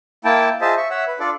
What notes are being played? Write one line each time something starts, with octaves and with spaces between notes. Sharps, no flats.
A#3 E4 G5 A5
F4 G#4 C5 D#5 E5 A5
E5 C#6
C#5 E5 F#5 E6
B4
D4 F4 A4 D5